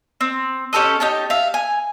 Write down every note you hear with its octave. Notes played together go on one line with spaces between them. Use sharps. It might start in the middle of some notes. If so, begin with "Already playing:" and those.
C4
C#4 G4 A4 D#5
D#4 G4 C#5 A5
E5 F5
G#5